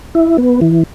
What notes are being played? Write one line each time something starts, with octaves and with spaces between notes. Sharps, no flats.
E4
B3
E3